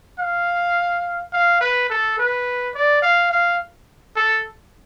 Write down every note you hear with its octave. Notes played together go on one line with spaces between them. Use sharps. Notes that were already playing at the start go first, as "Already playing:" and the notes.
F5
F5
B4
A4
B4
D5
F5
F5
A4